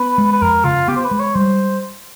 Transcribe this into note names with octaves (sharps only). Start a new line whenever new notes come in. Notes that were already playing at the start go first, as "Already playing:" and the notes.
Already playing: B3 B4
G#3
B4
F2 A#4
C#3 F4
B3 G4
C5
B4
G#3
C#5
G3 C5